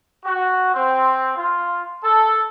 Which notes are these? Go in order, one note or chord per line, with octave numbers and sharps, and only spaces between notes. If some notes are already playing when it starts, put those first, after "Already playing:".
F#4
C4
F4
A4